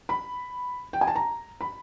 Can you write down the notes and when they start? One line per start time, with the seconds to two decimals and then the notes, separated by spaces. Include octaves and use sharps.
0.09 B5
0.93 G5
1.01 G#5
1.07 A5
1.16 A#5
1.61 B5